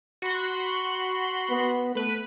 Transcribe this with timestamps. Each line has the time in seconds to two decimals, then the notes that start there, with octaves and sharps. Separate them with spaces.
0.22 F#4 B5 C6
1.50 B3
1.95 A3 B4 B5